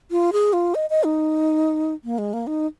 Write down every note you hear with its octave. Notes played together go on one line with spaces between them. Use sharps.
F4
G#4
F4
D#5
D#5
D#4
A#3
G#3
A#3
D#4